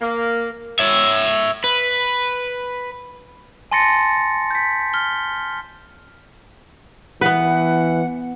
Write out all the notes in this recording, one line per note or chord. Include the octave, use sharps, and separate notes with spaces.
A#3
C#5 E5
B4
G#5 A5 C6 A6 A#6 C#7
G6 B6
F6 G7
E3 B3 B4 F#5